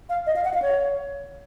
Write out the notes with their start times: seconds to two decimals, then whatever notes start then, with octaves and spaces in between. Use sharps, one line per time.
0.09 F5
0.27 D#5
0.36 F5
0.45 F#5
0.54 F5
0.62 C#5